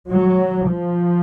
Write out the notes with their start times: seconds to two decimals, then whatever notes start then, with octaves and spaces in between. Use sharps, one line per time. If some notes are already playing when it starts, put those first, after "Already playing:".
0.10 F#3
0.69 F3